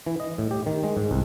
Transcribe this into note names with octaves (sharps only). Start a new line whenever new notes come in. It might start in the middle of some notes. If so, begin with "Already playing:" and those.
E3
D#5
A2
G4
D#3
G#3
G#2
C2